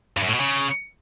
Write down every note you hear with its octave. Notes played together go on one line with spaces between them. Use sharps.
G2
F#2
A2
B2
C#3